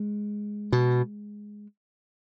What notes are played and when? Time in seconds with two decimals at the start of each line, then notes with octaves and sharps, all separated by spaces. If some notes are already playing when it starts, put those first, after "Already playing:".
Already playing: G#3
0.72 B2